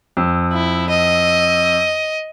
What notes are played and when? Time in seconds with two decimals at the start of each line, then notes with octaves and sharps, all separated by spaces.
0.17 F2
0.53 E4
0.90 D#5